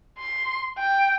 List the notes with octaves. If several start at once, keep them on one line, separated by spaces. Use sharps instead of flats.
C6
G5